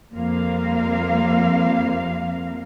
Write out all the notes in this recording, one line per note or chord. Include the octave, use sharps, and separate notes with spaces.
F2 G3 A#3 C4 A#4 F5